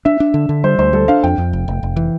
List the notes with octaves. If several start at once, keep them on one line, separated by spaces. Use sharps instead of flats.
D4 E5
D4
D3
D3
G3 C5
D2 C5
G3 A4
D4 F5
F2 G5
F2
F1
F1
F1
E3